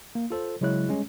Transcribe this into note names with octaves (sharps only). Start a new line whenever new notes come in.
A#3
F4 A4 C5
C#3 F#3 G#3 E4 C#5 F#6
G3 G#3 C#4